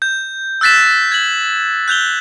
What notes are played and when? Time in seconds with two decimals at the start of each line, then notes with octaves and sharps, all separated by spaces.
0.02 G6
0.61 E6 F#6 A6 B6 E7
1.12 G#6 F#7
1.88 F#6 G6 F7 G7